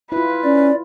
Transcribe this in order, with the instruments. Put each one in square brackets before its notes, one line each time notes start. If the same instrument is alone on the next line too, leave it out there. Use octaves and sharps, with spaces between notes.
[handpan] E4 F4 [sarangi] B4
[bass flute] C#4 [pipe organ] D5